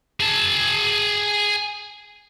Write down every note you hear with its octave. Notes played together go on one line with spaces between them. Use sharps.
G#4 A5